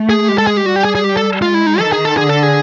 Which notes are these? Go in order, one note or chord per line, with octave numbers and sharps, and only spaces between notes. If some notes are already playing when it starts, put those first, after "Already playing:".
Already playing: A3
G#4
G#3 G4
A4
G#4
G4
G3 F#4
G4
G#4
G#4
G4
A4
G#3 F4
E4
D#4
D#3 A4
G#4
A4
D3 G#4
A4
G#4